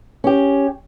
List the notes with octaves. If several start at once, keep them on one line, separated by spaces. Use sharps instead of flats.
C#4 G4